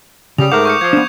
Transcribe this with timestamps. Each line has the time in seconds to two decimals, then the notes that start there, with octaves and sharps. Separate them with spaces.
0.38 C#3 G3 D#6 F7
0.52 G#2 A3 A#4 F#5 D6 G6
0.65 C#6 G6 C#7
0.81 F3 G#6
0.93 B3 D4